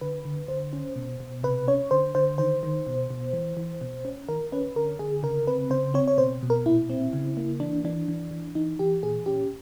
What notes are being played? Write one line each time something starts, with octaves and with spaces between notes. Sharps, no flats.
D3 B4
D3
D3 C5
C#4
B2
B2
C3 B4
C#4 C#5
D3 C5
D3 C5
D#3 C5
D#3
B2
B2
E3
E3
B2
C#4
D#3 A#4
C#4 B4
D3 A#4
D3 G#4
C#3 A#4
C4 B4
C#3 C5
C4 C#5
C#5
B2 C5
B2
A#4
A#2 E4
C4
C#3
A#3
E3 D4
E3 D4
E3
E3
E3 D#4
E3 G4
A#2 G#4
C#4 G4